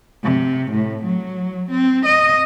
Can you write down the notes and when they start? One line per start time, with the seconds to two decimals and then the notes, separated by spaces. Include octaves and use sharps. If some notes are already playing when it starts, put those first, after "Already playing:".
0.24 C3
0.71 A2
1.04 F#3
1.71 C4
2.06 D#5